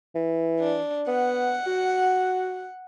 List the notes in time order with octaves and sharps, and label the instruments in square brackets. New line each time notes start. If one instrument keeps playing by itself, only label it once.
[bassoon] E3
[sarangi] D4
[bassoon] B3 [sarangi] F#5
[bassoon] F#4